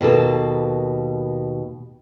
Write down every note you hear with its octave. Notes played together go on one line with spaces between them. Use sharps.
D#2 B2 A#3 A4